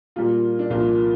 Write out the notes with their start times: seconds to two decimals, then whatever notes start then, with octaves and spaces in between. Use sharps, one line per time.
0.16 A#2 G3 A#3 F4
0.59 D4
0.70 C2 A#2 F3 A#3 F4